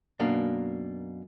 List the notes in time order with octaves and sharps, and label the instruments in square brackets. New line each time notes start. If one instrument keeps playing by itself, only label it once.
[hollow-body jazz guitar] F#2 B2 A#3 D4